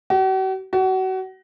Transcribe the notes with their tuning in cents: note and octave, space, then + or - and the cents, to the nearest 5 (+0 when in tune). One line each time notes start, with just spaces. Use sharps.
F#4 +45
F#4 +30